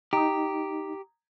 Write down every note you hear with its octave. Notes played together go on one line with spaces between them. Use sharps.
D#4 G4 A#5 D#6